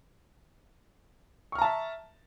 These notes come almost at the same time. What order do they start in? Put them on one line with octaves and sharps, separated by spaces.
C#6 F6 A#5 A5 E5